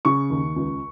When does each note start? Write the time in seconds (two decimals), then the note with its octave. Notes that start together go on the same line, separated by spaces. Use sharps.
0.05 C#3 C#6
0.30 D#2
0.56 C#2